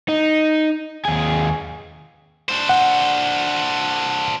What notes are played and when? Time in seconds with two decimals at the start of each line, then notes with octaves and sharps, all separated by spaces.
0.08 D#4
1.05 D#2 G#4
2.49 D4 C5
2.69 F#5